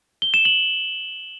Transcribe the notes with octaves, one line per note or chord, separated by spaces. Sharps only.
G7
E7
F#7